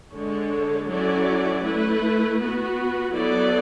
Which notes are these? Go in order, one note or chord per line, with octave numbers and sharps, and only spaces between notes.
D3 G#3 D4 A4 C#5
F#3 C#4 E4 A4 D5
A3 E4 B4
B3 F#4 B4
F#3 B3 E4 A4 D5